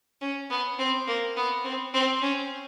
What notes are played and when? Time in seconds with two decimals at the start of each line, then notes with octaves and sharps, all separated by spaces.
0.21 C#4
0.50 B3
0.79 C4
1.07 A#3
1.37 B3
1.65 C4
1.94 C4
2.22 C#4